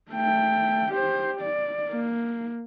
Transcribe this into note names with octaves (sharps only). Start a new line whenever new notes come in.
A3 G5
G4 C5
D5
A#3